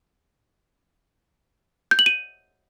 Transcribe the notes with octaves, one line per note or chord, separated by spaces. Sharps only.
G6
F#7
D#7